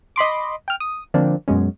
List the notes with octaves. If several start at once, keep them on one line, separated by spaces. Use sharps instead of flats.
D#5 B5 C6 D6
G5 F6
D#6
D3 F3 A#3 C4 D4
F#2 B2 G#3 C#4